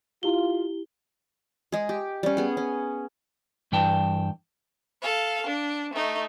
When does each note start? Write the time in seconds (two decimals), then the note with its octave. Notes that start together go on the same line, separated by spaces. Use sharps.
0.23 E4 F4 G4 G7
1.72 G#3 G#4
1.89 G4
2.23 G3 C#4
2.37 B3 G#4
2.57 C#4
3.72 G2 E3 D5 G5 A5
5.02 A4 F5
5.47 D4
5.93 A3 D#4